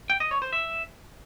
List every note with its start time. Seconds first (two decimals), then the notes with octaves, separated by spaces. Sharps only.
0.10 G5
0.20 D#5
0.31 C#5
0.42 C5
0.53 E5